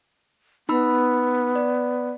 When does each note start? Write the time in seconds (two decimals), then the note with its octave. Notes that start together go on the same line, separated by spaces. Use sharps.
0.69 B3 D#4 B5 E6
1.56 D5